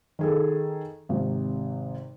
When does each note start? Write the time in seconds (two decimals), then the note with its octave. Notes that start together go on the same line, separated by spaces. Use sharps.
0.19 D#3 G#4 A4
1.09 G#1 C3